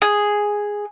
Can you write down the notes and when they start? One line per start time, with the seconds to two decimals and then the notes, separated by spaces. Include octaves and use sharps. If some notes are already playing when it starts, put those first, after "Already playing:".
0.02 G#4